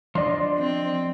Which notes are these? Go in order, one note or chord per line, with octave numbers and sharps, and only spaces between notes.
F3 D4 D5 D#5 C6
C4